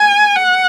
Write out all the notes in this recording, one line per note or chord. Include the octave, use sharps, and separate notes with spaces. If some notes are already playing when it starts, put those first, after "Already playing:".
Already playing: G#5
F#5